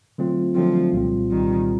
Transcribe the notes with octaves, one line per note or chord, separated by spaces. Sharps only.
D3 F#3 A3 C4 F4
D3 F3 F#3 A3 C4 F4
C2 A#2 G3 C4 F4
C2 A#2 D#3 G3 C4 F4